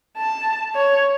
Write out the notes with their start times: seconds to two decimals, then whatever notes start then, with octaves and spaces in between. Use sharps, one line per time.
0.17 A5
0.76 C#5